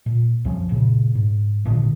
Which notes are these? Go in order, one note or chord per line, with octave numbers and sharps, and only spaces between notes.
A#2
C2 F#2 F3 C#4
F#2 A#2 C#3
G#2
A1 A#2 D3 D#3